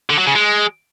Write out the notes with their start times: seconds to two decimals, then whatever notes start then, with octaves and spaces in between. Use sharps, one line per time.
0.10 D3
0.18 F#3
0.27 C#3
0.35 G#3